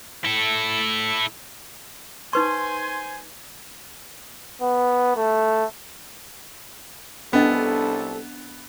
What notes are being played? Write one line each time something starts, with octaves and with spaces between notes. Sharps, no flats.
E4 A4
D#4 B4 C5 G#5 C6 C#6
B3
A3
C2 B3 C#4 D4 A4 D#5